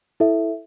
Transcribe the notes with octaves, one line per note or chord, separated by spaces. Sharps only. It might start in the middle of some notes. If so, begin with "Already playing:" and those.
E4 A4 E5